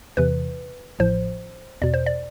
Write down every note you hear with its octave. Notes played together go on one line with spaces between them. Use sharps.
E2 C3 E3 B4
A1 A2 F3 C5
E2 B2 D5
C5
D5